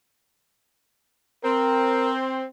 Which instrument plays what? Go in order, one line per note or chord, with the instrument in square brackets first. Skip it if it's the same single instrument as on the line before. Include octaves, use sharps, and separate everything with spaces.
[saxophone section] C4 [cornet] A#4